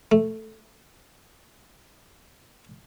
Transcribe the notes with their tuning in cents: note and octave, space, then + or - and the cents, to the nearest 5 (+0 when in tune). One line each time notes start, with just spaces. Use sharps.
A3 +0